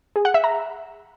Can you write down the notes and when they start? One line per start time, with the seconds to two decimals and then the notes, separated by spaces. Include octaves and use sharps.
0.16 G#4
0.25 F#5
0.34 E5
0.44 A#5